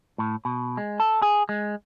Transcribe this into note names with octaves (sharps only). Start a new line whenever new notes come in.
A2
B2
G#3
A4
G#4
G#3